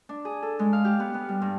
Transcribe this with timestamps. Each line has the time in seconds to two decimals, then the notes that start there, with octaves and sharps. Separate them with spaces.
0.09 D4
0.25 G#4
0.43 A4
0.59 G#3
0.73 F5
0.85 G4
1.00 B3
1.14 B3
1.29 G3
1.42 G2